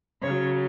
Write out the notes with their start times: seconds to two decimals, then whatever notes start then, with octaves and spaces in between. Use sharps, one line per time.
0.22 C#3 F#3 C#5